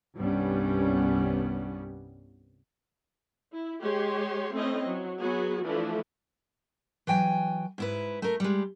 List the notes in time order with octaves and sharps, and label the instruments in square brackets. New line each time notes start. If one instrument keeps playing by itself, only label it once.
[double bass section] C2 G2 G3 B3 C#4
[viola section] E4
G#3 G4 C#5 C6
A3 C4 C#4 E4 D#5
F#3
F#3 B3 F#4 G#4
E3 F3 A3 D4
[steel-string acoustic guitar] E3 F#3 G5 G#5
G#2 E4 B4
A3 A#4
G3 G#3